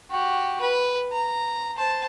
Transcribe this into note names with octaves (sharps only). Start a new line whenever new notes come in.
F#4 G4
B4
A#5
C5 A5